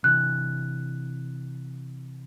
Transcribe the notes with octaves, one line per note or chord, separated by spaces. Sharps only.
C3 E3 F#6